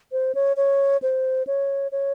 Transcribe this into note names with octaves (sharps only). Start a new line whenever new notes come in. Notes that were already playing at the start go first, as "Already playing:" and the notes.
C5
C#5
C#5
C5
C#5
C#5